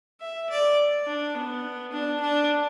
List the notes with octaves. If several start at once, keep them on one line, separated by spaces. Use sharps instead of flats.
E5
D5
D4
B3
D4
D4